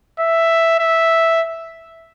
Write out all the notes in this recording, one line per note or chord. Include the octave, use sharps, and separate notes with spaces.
E5
E5